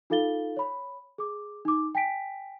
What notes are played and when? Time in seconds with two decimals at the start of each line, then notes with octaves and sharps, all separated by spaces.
0.10 D#4 F4 A4 F5 A6 G7
0.57 C#5 B5
1.18 G#4 D6
1.65 D#4 D6
1.95 G5 G#5 B6 D7